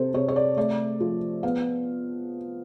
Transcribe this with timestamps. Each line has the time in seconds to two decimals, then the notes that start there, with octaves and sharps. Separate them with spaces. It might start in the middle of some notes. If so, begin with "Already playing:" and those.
Already playing: C3 A4 C5
0.14 C3 C#5
0.28 C#5
0.36 D5
0.57 A3 D5
1.00 F3
1.43 B3 F5